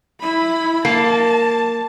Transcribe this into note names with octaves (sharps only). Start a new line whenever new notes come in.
E4 B5
A#3 A5